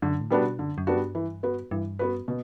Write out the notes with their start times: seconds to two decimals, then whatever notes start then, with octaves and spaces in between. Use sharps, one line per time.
0.02 F#2 D3
0.17 G2
0.21 A2
0.30 G3 B3 D4 F#4
0.40 B2
0.59 F#2 D3
0.78 F#2
0.87 G3 B3 D4 F#4
0.96 G2
1.15 E3
1.43 B3 F#4 B4
1.71 G2 E3
1.99 B3 F#4 B4
2.28 B2